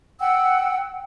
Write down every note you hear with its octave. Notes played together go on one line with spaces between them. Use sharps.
F#5 G5 E6